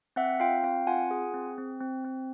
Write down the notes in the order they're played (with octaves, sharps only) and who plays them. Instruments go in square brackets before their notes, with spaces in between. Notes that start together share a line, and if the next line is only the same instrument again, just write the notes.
[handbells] C4 E5 F#5
F4 F5 G5
C4 F5 G5
F4 F#5 G#5
G#4
C4
C4
C4
C4